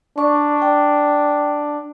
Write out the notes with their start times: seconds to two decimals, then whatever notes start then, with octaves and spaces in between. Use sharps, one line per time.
0.18 D4 D5 C#6
0.62 G5